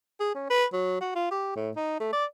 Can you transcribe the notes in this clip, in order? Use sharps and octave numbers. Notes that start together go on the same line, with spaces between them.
G#4
C#4
B4
F#3
F#4
F4
G4
A2
D#4
A3
D5